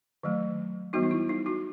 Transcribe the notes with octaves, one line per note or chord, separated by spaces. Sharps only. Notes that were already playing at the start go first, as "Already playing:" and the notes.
D#3 F#3 A3
E3 G3 B3 D#4 F#4
D#4
E4
D#4
D#4 F#4